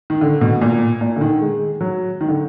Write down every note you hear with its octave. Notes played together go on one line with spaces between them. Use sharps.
D#3
D3
B2
A#2
A#2
D3
D#3
G#3
F#3
D#3
D3